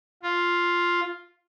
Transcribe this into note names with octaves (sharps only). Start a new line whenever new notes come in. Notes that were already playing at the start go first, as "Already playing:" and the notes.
F4